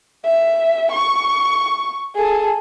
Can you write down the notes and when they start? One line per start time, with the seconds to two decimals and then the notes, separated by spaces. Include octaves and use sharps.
0.24 E5
0.91 C#6
2.15 G#4 A4